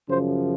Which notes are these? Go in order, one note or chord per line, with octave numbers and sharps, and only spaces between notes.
F#2 C#3 F3 C5